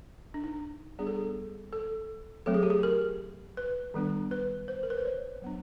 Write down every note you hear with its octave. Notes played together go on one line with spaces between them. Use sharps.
D4
D#4
G3 B3 D4 G#4
A4
G#4
A4
F#3 A3 C4 A4
G#4
G4
G#4
A#4
B4
D#3 G3 B3 D4
B4
C5
A#4
B4
C5
C#5
F#3 B3 D4